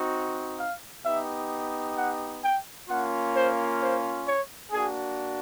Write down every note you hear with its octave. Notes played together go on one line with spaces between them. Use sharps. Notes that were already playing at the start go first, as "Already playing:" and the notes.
Already playing: C4 D#4 F#4
F5
B3 D#4 G4 E5
F#5
G5
A#3 C#4 F4 F#5
C5
C5
C#5
A#3 D4 F#4 G#4